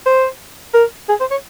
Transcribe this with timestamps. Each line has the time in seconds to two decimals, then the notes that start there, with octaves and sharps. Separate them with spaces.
0.06 C5
0.74 A#4
1.09 G#4
1.20 C5
1.31 C#5